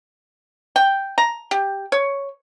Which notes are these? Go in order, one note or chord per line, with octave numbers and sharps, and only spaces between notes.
G5
A#5
G4
C#5